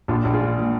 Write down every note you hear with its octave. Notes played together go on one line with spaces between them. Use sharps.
A#1 D4 F4
A#1
F4 G#4
G#3
A#2